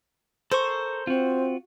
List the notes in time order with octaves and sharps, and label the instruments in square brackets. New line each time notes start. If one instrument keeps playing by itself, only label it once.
[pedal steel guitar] A4 A#4 C#6 [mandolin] C5
[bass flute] C4 [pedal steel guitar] F4 F#4